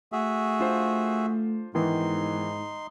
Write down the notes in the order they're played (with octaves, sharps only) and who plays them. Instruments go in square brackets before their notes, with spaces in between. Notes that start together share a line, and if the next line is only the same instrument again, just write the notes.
[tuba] A3 [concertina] F#4 G#4 E5
[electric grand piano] D4 F4 C5
[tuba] G#2 [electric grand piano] D#3 E3 B3 [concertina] D#4 C6